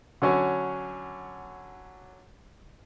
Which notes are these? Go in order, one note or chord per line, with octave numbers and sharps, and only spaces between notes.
D3 F#3 C#4